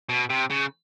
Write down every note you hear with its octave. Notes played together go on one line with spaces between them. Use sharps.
B2
C3
C#3